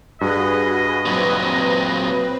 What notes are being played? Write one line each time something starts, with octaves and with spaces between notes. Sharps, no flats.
G2 F#4 G#4 B4 D#5
A#2 F#3 C4 B4